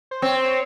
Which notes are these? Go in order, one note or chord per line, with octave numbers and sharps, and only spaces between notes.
C5
C4 C#5
C5
C#5